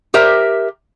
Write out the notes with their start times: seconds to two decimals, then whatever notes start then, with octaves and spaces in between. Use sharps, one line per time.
0.14 G4 A#4 C5 E5